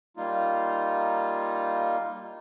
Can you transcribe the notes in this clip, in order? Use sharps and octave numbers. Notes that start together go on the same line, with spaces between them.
G3 A#3 D#4 F4